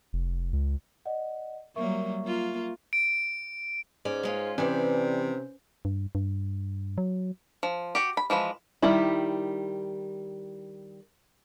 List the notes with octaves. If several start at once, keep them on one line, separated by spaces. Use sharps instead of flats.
F1
C#2
D5 D#5 F#5
F#3 G3 A#3 A#4 E5 C#6
A#3 F4
D7
G#2 C#4 D5
G#3 C#4 F4
C3 E3 G3 C#4 C5 D5
G2
G2
F#3
F3
F#4 G4
B5
E3 F3 G#3 B5
D#3 G3 E4